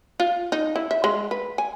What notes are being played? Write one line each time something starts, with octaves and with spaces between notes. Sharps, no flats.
F4
D#4
E4
E5
G#3
B4
G#5